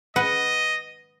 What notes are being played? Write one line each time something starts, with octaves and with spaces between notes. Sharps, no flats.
B4 D#5 F#5